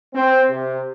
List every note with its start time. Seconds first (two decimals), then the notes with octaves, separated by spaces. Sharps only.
0.13 C4
0.49 C3